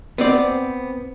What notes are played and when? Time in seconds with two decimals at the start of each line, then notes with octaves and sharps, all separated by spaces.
0.18 B3 C4 D5